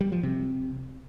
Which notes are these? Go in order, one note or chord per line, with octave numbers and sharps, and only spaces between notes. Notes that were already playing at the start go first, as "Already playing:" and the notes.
G3
F3
C3